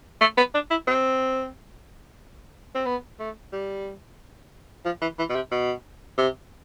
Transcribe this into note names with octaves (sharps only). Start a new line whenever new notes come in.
A3
B3
D4
E4
C4
C4
B3
A3
G3
F3
E3
E3
B2
C3
B2
C3